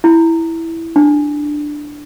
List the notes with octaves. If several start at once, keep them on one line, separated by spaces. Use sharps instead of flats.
E4
D4